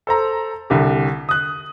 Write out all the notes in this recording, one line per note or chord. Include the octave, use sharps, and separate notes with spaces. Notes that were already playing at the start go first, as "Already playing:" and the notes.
A4 C5 A#5
C2 D3 G4
D#6 F#6